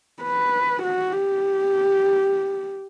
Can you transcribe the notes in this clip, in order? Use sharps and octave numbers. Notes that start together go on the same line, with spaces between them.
B4
F#4
G4